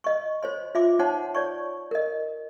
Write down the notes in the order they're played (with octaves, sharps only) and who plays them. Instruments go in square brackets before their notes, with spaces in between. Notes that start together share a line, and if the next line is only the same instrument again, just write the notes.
[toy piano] D#5 C#6
C5 C#5 C6
F4 E5 C6 D6
D#4 C5 C#5 F#5 A5 C6
C#5 D5 C#6
A#4 D#5